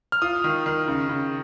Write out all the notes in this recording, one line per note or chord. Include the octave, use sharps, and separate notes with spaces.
F6
F4 D#6
D#3
D#3
C#3
C#3